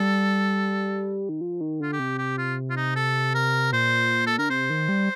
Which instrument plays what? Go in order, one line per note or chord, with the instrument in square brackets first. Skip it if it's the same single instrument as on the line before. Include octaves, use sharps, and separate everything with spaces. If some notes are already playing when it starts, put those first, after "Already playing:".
Already playing: [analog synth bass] G3 [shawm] A4
[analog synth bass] D#3
F3
D#3
[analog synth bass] D3 [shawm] F4
[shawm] G4
[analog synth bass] C3
[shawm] G4
F4
F4
D#4
A4
A#4
[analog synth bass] A#2 [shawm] C5
[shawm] A4
[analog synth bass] D3 [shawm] A#4
[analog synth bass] C3 [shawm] C5
[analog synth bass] D#3
G3